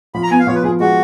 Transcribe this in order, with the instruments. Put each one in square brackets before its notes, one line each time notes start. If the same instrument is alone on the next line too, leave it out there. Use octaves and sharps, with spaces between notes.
[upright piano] F3 [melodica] B5
[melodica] A#5
[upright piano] B3 [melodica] G#5
[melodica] F5
[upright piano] F3 [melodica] C#5
[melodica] B4
[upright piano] F3 [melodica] G#4
[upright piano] G#3 [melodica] F#4